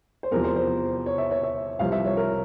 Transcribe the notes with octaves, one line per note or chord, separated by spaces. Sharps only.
C5
E2 C3 F3 A#4
C5
C5
C#5
E5
C#5
E5
C2 C3 F3 F5
E5
C#5
A#4